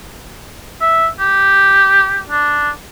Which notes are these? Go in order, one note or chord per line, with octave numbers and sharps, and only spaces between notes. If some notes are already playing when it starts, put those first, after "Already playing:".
E5
G4
D4